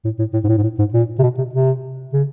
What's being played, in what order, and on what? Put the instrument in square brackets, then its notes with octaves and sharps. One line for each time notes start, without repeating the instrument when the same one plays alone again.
[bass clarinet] A2
A2
A2
G#2
A2
G#2
A2
G#2
A#2
C3
B2
C3
C3
C#3